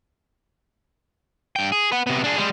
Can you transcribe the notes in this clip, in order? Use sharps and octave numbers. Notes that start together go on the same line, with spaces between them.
G2 G5
G#4
B4 F#5
C3 B3
D4 G#4
G3 G#3